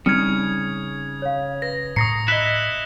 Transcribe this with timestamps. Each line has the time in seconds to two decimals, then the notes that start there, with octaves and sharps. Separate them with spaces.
0.06 C#3 G3 C4 D#4 D#6 F6 G#6 C#7
1.22 C#5 F5
1.62 B4 A#6
1.96 A2 A#5 C#6 D#6 A#6 C7 C#7
2.28 E4 D#5 E6 F#6 B6 G7